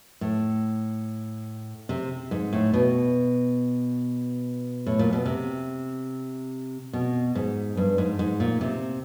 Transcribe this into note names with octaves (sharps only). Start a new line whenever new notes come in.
A2
C3
G#2
A2
B2
A2
A#2
B2
C3
B2
G#2
G2
G#2
G#2
A#2
C3